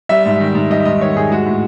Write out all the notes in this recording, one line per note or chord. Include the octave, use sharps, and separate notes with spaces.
G3 E5
G#2
D#3
G#2
G3 D#5
G#2 D#5
D#3 C#5
G#2 G#4
G#3 F#4
A2